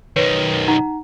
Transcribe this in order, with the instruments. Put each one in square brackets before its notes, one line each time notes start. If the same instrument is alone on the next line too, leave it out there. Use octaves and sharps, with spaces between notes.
[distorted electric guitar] B1 D#3 [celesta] B4 C#5
[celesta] D#4 F#5 A#5